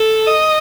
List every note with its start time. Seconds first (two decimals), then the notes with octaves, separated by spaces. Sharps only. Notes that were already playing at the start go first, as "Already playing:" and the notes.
Already playing: A4
0.27 D#5